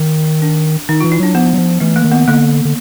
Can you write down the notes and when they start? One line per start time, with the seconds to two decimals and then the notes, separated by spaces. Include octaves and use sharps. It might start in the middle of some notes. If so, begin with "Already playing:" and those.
Already playing: D#3
0.42 D4
0.89 D#3 D#4
1.00 E3 F4
1.12 E4
1.20 F#3 D4
1.34 F3 B3
1.53 F#3
1.58 F3
1.80 E3 A3
1.96 A#3
2.04 D#3
2.12 B3
2.28 D3 A#3
2.65 D3